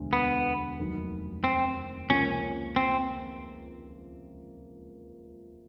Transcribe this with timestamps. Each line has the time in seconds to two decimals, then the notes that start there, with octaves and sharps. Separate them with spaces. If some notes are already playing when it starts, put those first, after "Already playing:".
Already playing: E1 D2 D3
0.13 B3
0.79 F1 D#2 D#3 F#3
1.44 C4
2.10 C#2 C3 F3 A#3 C#4
2.76 C4